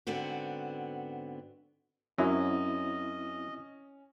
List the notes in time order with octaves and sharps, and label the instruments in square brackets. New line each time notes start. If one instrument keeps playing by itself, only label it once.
[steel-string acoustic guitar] G#2 D3 B3 C4 F#4
[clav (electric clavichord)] F#2 F#3 [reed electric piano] C4 E4 [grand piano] C#4 [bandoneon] D#5